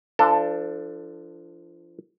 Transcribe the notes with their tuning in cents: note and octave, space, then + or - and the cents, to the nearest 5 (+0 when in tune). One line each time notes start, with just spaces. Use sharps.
F3 -30 D4 +0 A4 +15